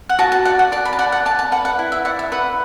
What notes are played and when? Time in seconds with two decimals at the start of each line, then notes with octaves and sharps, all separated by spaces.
0.09 F#5
0.19 F#4 A5
0.32 A5
0.45 D5 F#5
0.59 F#5
0.72 D5 A5
0.85 B5
0.93 A5
0.99 D5 F#5
1.12 F#5
1.26 D5 A5
1.39 A5
1.52 B4 F#5
1.65 F#5
1.79 E4
1.92 E5
2.05 D5 F#5
2.19 E5
2.32 B4 F#5